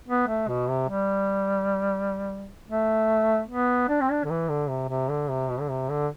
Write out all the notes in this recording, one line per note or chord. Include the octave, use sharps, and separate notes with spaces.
B3
A3
B2
C3
G3
A3
B3
D4
C4
D4
D3
E3
D3
C3
C3
D3
C3
B2
D3
C3
D3